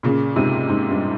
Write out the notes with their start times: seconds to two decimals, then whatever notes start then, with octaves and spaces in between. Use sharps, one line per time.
0.03 A#2 C#3
0.36 G#2 C3
0.69 G#2
0.90 G2